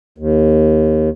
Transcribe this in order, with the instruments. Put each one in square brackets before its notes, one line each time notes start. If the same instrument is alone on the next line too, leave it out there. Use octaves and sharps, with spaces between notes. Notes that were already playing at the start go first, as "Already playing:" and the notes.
[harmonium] D#2